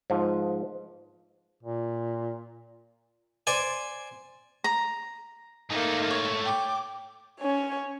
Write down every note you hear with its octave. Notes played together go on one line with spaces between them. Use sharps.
G#2 F3
A#2
C5 D5 G#5
A#5
G#2 A3 A#3 D#4
C#5
G5 D6
C#4 C#5